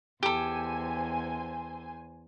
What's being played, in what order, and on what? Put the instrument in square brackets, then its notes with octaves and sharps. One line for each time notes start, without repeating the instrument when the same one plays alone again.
[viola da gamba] E2 [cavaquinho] G4 A4 [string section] C5 G#5